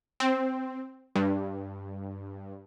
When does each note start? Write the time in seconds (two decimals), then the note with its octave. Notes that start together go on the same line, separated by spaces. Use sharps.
0.20 C4
1.15 G2